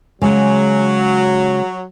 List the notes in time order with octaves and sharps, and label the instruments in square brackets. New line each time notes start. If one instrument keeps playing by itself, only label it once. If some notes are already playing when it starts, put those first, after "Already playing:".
[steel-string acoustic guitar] C#3 G#3 [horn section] F#3